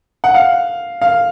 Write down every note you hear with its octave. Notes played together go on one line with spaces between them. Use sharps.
F#5
F5
F5